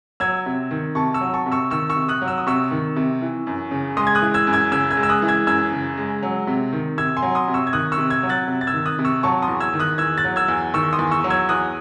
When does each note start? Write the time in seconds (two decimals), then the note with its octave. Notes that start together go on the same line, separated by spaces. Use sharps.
0.20 F#3 E6 G#6
0.46 C3
0.71 D#3
0.95 C3 A5 C#6
1.14 C#6 E6
1.21 F#3
1.34 A5 C#6
1.46 C3
1.52 C#6 E6
1.70 D#3 C#6 E6
1.90 C#6 E6
1.96 C3
2.09 D#6 F#6
2.22 F#3
2.28 E6
2.38 D#6
2.47 C3 C#6 E6
2.71 D#3
2.96 C3
3.22 E3
3.47 F#2
3.71 C#3
3.97 G#3 C6 D#6
4.07 G#6
4.15 D#6 F#6
4.22 E3
4.34 E6 G#6
4.47 F#2
4.53 E6 G#6
4.72 C#3 E6 G#6
4.91 E6 G#6
4.97 G#3
5.03 E6
5.09 D#6 F#6
5.22 E3
5.28 E6 G#6
5.47 F#2 E6 G#6
5.73 C#3
5.97 G#3
6.23 F#3
6.47 C3
6.73 D#3
6.98 C3 E6 G#6
7.17 G#5 C6
7.22 F#3
7.35 C6 D#6
7.48 C3
7.54 C#6 E6
7.67 G#6
7.73 D#3 D#6 F#6
7.92 C#6 E6
7.97 C3
8.10 E6 G#6
8.23 F#3
8.29 F#6 A6
8.48 C3
8.61 A6
8.67 E6 G#6
8.73 D#3
8.86 D#6 F#6
8.99 C3
9.05 C#6 E6
9.23 F#3 A5 C#6
9.42 C6 D#6
9.48 E2
9.60 E6 G#6
9.74 D#3
9.80 D#6 F#6
9.98 E2 E6 G#6
10.18 F#6 A6
10.24 F#3
10.36 E6 G#6
10.48 E2
10.74 D#3 C#6 E6
10.93 C6 D#6
10.99 E2
11.11 C#6 E6
11.24 F#3
11.30 E6 G#6
11.49 E2 D#6 F#6